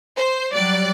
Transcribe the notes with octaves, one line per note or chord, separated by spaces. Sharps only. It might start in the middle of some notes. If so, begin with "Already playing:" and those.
C5
F#3 G3 D5 F#6